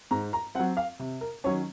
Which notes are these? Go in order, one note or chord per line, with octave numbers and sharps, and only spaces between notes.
G#2 A#5
A#5
F#3 C4 F#5
F5
C3
A#4
D#3 F#3 C#4 C#5